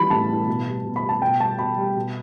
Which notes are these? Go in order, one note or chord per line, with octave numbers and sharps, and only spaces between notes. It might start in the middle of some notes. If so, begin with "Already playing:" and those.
Already playing: E3 G3 B5
A2 A5
E3 G3
B2
G3
B2
B5
G3
A5
B2 G5
G3 A5
B2 B5
G3
B2